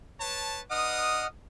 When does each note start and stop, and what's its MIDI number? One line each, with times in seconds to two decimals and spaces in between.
0.20 0.62 71
0.20 0.62 73
0.20 0.62 81
0.70 1.25 62
0.70 1.25 71
0.70 1.27 75
0.70 1.27 78
0.70 1.25 87
0.70 1.27 89